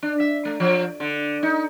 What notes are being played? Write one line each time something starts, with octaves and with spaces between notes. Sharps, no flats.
D4
E5
A3
F3
D3
D#4